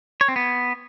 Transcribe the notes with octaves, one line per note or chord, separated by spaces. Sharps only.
C#5
C4
B3